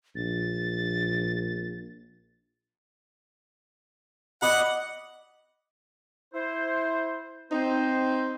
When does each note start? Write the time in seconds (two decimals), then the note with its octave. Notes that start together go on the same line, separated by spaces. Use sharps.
0.16 A#1 A6
4.42 D5 D#5 F#5 B5
6.33 E4 C5
7.51 C4 D#4 C5